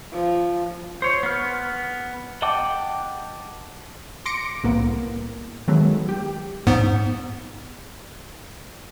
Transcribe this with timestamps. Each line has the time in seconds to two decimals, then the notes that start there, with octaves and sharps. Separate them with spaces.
0.13 F3
1.02 C5 C#5
1.23 B3 F6
2.42 D#5 F#5 G5 A5 D6
4.26 C6 D6 A#6 C#7 D7
4.63 C2 A2 A#3 B3
5.68 D#3 F#3 G#3 A3 B3
6.09 G4
6.67 G#2 B3